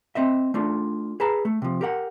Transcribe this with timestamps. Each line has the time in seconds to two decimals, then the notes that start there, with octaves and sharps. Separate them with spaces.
0.15 C4 D#5 E5
0.54 A3 D4 F4
1.20 G#4 B4 A5 A#5
1.45 A3
1.62 C3 F3
1.81 G4 A#4 F#5